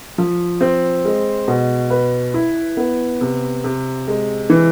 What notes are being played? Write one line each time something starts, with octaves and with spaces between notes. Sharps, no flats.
F3
C4
G#3
B2
B4
E4
B3
C3
C3
G#3
E3